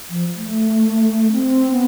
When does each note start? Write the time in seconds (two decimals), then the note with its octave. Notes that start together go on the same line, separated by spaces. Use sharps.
0.10 F3
0.36 A3
1.32 C4
1.72 B3